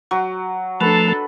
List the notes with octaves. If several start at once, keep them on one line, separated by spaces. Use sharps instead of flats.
F#3
F3 A3 D4 A4 B4